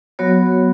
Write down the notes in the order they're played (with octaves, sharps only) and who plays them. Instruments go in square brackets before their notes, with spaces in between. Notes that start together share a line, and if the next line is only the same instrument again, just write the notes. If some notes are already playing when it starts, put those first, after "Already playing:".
[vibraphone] F#3 B3 F#4 C#5